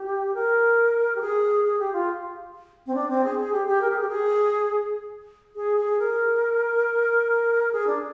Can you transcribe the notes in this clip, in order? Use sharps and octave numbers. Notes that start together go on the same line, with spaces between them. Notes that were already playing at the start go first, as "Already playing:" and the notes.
Already playing: G4
A#4
G4
G#4
G#4
G4
F4
C4
D4
C4
G#4
G#4
G4
G4
A#4
G#4
G4
G#4
G#4
G#4
A#4
G#4
D4